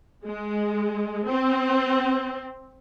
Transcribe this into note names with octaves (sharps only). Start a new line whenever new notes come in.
G#3
C4